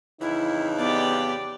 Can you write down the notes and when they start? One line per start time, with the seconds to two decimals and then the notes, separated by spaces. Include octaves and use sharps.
0.21 F2 C#3 E3 D#4 E4
0.78 B3 G4 D5